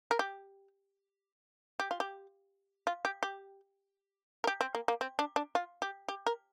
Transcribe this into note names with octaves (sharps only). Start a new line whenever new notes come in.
A#4
G4
G4
F4
G4
F4
G4
G4
A#4
G4
C4
A#3
A#3
C4
D4
D4
F4
G4
G4
A#4